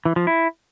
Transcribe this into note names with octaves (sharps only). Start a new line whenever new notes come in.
E3
F3
E4